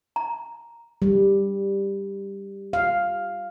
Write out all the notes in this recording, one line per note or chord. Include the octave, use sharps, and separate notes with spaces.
A#5
G3
F5